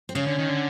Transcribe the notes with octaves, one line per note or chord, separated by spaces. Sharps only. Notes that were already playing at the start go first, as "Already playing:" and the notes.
C4
C#3 C#4
D3
D#3
D3